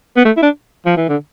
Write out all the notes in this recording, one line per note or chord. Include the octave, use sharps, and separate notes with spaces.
B3
A3
E4
D4
F3
E3
D3